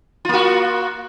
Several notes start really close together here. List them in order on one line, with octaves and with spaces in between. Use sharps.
F4 A#3 F#4